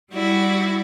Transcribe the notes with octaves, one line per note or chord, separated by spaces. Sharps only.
G3 E4 F#4 D5